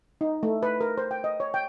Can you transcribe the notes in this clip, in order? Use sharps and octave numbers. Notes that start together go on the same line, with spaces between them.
D#4
A3
B4
A#4
C5
G5
D#5
C#5
G5